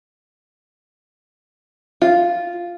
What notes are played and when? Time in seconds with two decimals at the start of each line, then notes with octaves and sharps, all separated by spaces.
2.02 F4